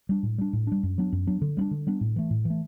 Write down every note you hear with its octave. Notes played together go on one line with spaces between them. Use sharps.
G3 D4
A2
G3 D4
A2
G3 D4
F#2
F#3 B3 D4
F#2
F#3 B3 D4
D3
G3 B3 D4
D3
G3 B3 D4
A2
E3 A3
A2
E3
A3